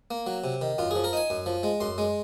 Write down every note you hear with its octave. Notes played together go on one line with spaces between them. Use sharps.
A#3
F#3
C3
D#3
F#2 F4
F3 G#4
A#4
D#4 G#5
F#2
F3
G#3
F#2 C6
G#3